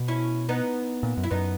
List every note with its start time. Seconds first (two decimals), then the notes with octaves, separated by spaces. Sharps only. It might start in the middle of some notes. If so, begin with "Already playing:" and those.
Already playing: B2
0.08 C#4 E4
0.49 B3 D#4
1.03 A#2
1.17 F#2
1.23 E4
1.31 F#2 B3 D#4